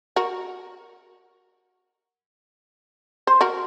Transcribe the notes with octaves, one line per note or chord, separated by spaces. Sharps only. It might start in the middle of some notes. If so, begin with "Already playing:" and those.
F#4 A#4
C5
F#4 A#4